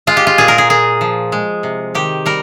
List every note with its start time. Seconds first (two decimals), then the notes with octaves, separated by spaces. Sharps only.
0.07 G#3 F4
0.17 G4
0.27 F4
0.38 A#2 G#4
0.48 A#4
0.58 G#4
0.70 A#2 G#4
1.01 F3
1.32 G#3
1.63 C3
1.95 D#3 G4
2.26 G3 A#4